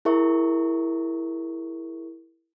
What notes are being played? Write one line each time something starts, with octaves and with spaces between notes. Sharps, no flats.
E4 G#4 A#4 E5 C#6